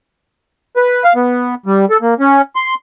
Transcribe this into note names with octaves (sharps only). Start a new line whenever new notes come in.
B4
F5
B3
G3
A4
A#3
C#4
C6